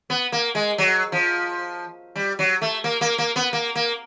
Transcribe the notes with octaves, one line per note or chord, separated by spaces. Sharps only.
B3
A#3
G#3
F#3
F3
G3
F#3
A3
A#3
A#3
A#3
B3
A#3
A#3